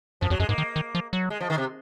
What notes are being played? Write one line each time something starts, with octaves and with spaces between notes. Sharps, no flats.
F#2 F3
F2 F#3
F#2 G#3
G#2 A#3
D#3
D#3
F3
F#3
G#3
F3
D#3
C3